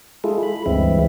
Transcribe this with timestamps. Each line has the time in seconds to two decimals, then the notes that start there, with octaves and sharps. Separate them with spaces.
0.24 G#3 E4 F4 G#4 A4
0.43 B5
0.66 D2 G2 E3 G#3 C4 E5